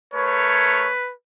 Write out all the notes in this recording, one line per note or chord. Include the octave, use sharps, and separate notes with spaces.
A3 A#4 B4 C#5